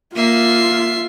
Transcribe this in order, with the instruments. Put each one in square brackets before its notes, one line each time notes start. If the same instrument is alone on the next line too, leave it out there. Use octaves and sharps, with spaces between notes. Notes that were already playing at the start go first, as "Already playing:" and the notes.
[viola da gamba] A#3 [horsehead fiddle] F4 [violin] E5 C7